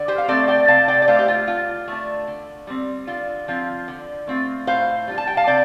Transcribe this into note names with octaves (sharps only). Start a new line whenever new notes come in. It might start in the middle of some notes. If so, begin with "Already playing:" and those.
Already playing: D3
G4 C5
F5
A3 C4 A4 D5
D5 G5
C3 F5 A5
D5 G5
D5
A3 D4 C5 F5
G4
F4
D3 F4
A3 D4
D3
G3 C4
D3 F4
F3 C4 F4
D3
A3 C4 F4
A2 C5 F5
G3 D4 F4
A5
G5
F5 A5
C3 D5 G5